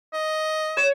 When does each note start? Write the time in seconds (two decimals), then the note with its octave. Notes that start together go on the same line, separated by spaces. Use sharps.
0.13 D#5
0.77 C#5 E7